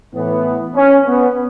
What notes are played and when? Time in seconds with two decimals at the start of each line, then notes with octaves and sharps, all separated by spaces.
0.13 A2 E3 B3
0.75 C#4
1.06 B3